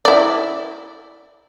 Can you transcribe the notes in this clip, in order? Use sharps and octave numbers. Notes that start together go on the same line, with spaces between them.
E4 D5